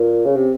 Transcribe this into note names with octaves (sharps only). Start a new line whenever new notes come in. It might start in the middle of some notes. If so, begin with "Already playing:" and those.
Already playing: A#2
C#3
C3